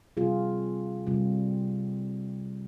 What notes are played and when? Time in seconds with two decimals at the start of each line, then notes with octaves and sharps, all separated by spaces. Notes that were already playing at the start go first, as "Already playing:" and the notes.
0.17 C3 G3 C4 F4 G#4
1.07 C3 G3 C4 F4